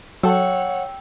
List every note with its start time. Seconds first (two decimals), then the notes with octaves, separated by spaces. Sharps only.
0.23 F#3 A4 C#5 F#5 G5 E6